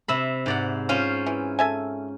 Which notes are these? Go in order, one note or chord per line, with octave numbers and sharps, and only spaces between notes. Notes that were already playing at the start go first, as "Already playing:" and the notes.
C3 E5 B5
G#2 D5 F#5
C#4 F4 C5
E3
A4 E5 G#5